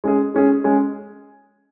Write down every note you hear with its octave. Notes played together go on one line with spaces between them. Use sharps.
G#3 C#4 G#4
G#3 C#4 G#4
G#3 C#4 G#4